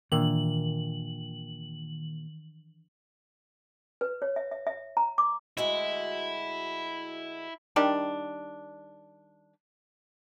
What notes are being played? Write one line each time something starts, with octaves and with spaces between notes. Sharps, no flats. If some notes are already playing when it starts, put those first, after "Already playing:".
A#2 D#3 E3 D4 E6 F#7
B4
C#5
E5
E5
E5
A#5
D6
D2 G#3 E4 F#4
D#3 G3 D4